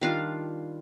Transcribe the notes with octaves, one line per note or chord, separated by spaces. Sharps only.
D#3 G3 D4 F4 F5